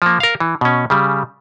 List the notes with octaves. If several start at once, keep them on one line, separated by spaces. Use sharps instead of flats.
F3 A#3
A#4 F5
E3
B2 C#4
C#3 G3